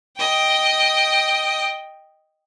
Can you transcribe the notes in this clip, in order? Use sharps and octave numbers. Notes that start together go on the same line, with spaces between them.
D#5 G5